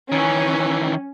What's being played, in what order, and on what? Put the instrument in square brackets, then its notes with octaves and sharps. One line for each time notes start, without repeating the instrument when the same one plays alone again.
[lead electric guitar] D#3 E3 [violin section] C#4